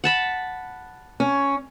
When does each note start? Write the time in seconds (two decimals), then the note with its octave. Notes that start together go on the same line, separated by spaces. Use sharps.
0.04 F#5 A5 B5
1.20 C#4